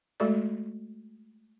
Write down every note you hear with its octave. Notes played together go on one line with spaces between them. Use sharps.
G#3 A3 F#4 A4 D5